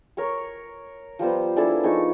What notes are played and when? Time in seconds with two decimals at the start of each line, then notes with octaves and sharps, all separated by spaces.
0.17 A#4 C#5 C#6
1.19 F3 G3 B3 C5
1.56 D4 E4 G#4 A4
1.83 F3 D#4 G#4 C#6